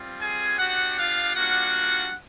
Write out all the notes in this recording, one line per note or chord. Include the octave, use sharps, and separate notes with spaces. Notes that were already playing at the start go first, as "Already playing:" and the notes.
Already playing: G3 C4 F4
G#4 G#5
B3 D4 F#4 G4 F#5
F4 F5
G3 A#3 D4 F4 F#4 F#5